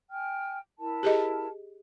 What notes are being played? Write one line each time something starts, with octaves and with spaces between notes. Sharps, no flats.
G5 G#5 F6
E4 A#4 A5
G4 G#4 D#5